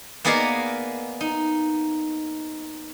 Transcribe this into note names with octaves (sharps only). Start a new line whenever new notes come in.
A#3 B3 G#4 D5 D#5 F5
D#4